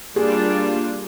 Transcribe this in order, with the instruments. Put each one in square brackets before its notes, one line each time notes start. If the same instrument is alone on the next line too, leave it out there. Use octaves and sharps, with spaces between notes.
[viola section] G3 A#3 D4 F4 [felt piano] G#4